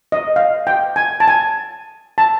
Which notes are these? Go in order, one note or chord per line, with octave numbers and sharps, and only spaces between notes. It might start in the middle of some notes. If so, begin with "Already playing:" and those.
D#5
F5
G5
G#5
A5
G#5
A5